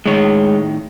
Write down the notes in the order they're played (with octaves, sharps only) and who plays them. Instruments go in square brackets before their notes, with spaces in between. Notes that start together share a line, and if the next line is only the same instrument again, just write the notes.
[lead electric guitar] A2 D#3 [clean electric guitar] G#3 C#5